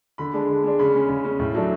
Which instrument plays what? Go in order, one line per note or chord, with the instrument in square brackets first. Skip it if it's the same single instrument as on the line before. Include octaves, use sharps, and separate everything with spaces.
[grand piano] D3 B5
G#3 D4
D3
G#3 D4
C#3 B5
G#3 C#4
C#3
G#3 C#4
A2
F#3 A3 D4